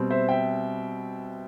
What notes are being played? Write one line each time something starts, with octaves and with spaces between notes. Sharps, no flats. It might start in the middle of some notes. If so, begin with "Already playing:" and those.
Already playing: B2 G3 C4
C5 E5
E5 G5